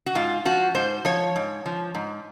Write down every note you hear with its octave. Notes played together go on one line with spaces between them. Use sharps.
F#4
G#2 F4
F3 F#4
G#2 C5
F3 C#5
G#2
F3
G#2